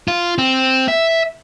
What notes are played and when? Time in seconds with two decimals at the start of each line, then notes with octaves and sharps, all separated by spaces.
0.08 F4
0.38 C4
0.88 E5